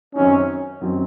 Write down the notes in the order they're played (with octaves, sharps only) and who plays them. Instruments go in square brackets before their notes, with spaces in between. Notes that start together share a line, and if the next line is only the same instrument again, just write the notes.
[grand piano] F#2 D#3 F#3 C4 D#4 [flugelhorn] C#4
[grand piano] F#2 D#3 F#3 C4 D#4